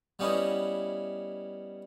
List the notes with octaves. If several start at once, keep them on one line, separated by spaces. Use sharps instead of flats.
G3 B3 C#4 D#4 E4